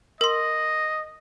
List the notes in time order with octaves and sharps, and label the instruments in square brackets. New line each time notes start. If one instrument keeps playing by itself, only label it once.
[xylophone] A#4 C6 [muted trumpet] D#5